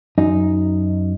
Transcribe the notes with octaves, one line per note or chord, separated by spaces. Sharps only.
F#2 D#4